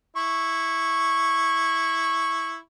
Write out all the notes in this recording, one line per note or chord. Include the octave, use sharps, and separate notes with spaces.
E4 C#6